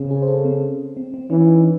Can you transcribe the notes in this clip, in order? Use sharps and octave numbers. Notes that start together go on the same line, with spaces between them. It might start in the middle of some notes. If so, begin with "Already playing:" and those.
Already playing: C#3 C4
G#4
C5
A4
C4
C4
C4
E3 C#4
D#4